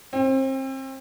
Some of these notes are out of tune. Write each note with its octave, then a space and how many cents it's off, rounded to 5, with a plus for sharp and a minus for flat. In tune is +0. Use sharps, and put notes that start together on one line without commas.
C4 +30